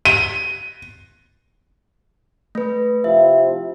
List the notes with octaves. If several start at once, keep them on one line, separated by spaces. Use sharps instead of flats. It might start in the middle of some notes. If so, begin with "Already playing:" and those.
D#7
A3 B4
C3 F3 E4 E5